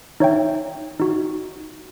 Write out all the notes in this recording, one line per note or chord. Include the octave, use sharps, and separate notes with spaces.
D#4 C#5 E5 G5
D#4 F#4